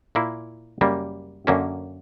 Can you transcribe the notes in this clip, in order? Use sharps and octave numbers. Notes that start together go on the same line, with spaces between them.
A#2 A#3 E4
F#2 C#3 G3 A#3
F#2 D3 A#3 C#4